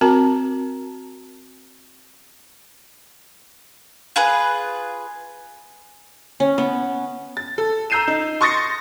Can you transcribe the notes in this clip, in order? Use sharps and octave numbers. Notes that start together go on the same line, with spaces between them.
C4 F#4 A#4 A5 A#5
F4 G#4 B4
C#4
B3
A6
A4
A#5 E6 G6 C7 D#7 E7
D#4
C6 C#6 D#6 A6 A#6 C#7